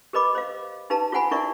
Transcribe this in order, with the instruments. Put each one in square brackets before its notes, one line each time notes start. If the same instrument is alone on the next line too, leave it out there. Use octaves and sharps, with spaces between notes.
[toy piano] G4 A#4 B4 D#5 B5 D6
C5 D#5 F5
D#4 G4 B4 F5 A5 A#5
F4 G4 C5 F#5 G#5 B5
D#4 E4 A#4 D5 E5 C#6